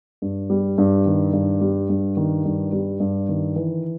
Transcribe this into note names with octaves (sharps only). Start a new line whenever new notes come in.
G2
G3
G2
D#3
G2
G3
G2
D#3
G2
G3
G2
D#3
E3